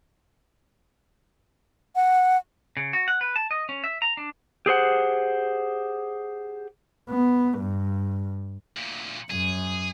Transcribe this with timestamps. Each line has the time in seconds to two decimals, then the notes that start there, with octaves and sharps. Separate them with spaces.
1.96 F#5
2.77 C#3
2.93 F#4
3.08 F#5
3.21 B4
3.36 A5
3.51 D#5
3.69 C#4
3.84 E5
4.02 A#5
4.17 D4
4.66 G4 G#4 C5 F#5
7.10 B3
7.59 G2
8.77 D2 A#2
9.30 F#2 G#4